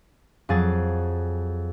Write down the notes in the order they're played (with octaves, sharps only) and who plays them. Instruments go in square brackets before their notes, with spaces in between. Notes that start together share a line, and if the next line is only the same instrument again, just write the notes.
[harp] F2 F#3 G#4 A6